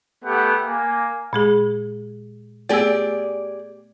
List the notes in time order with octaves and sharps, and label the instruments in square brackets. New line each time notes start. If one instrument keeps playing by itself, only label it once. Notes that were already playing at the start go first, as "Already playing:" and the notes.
[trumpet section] A3 B3 G4 F#5
A#3 G#5
[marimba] A#2 G#3 G#4
[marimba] A3 B3 E6 [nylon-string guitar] G4 G#4 D5